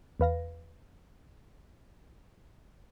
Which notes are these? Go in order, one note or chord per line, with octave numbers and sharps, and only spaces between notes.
E2 B4 F5 A#6